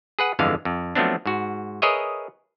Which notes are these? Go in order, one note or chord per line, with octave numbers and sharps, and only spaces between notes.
G#4 B4 F#5
G1 F2 D3 E3 G#3 F5
F2
F3 F#3 A3 B3 C4 D4
G#2 F#4
G#4 A#4 B4 C#5 D#5 E5